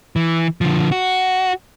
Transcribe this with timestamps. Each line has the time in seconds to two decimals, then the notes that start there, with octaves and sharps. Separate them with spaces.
0.16 E3
0.61 D3 F3
0.92 F#4